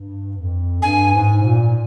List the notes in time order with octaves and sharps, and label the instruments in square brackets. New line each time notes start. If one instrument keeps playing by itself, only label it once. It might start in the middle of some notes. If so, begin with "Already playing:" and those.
Already playing: [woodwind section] G2
F2
[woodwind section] G2 [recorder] G#5
[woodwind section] G#2
A#2